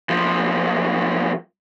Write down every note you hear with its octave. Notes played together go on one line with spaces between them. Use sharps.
B1 F3